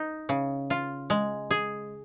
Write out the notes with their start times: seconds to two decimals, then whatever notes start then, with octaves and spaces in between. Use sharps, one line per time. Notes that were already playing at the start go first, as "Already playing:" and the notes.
Already playing: D#4
0.29 C#3
0.70 F4
1.10 G#3
1.51 G#4